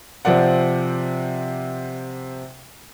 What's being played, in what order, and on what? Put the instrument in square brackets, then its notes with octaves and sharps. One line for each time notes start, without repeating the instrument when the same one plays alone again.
[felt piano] C3 F3 C4 D5 F#5